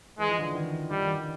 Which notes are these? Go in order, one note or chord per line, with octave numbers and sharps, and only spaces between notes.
E3 G#3
F3
D3 E3
E3
D#3
D#3 G3
D3
D#3